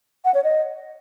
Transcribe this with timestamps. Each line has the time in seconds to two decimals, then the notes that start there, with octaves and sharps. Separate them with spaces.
0.25 F#5
0.34 C#5
0.44 D#5